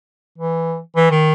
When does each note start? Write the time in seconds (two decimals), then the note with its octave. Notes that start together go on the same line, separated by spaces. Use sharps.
0.38 E3
0.96 E3
1.11 D#3